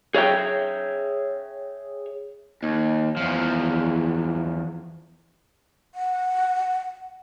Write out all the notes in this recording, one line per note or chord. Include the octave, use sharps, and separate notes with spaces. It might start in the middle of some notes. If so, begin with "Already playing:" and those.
G#4 C#5 E5 G5
D#2
E2 F3
F#5